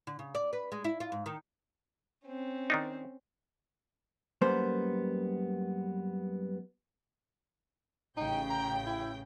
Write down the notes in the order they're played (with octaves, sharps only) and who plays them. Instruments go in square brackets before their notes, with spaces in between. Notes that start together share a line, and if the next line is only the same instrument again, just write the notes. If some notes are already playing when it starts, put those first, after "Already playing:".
[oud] D3
C#3
D5
B4
G#3
E4
F4
G#2
D#3
[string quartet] C4 C#4
[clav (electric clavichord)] D#3 D4 D#4
[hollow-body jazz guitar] F#2 G3 A#3 B3 C5
[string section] A1 C#3 G5 [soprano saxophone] D#4
[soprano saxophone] A#5
E4